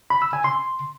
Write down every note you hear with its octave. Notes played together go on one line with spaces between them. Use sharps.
B5
E6
G#5
C6